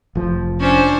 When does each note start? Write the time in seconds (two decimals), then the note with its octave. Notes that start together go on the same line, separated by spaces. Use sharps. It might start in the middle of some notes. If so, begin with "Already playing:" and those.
0.15 F1 F3
0.60 C#4 D4 C5